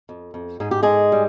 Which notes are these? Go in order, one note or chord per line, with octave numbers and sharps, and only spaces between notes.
F2
F2
G#2 G#4
G4
G#2 G#3 G#4
G3